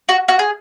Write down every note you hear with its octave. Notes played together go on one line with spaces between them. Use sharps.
F#4
F#4
G#4